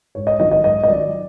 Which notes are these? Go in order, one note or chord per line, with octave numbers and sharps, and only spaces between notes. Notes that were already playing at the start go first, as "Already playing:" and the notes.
G#2 C#5
D#5
D#3 F#3 D#5
D#5
G#2 D#5
D#5
D#3 F#3 D5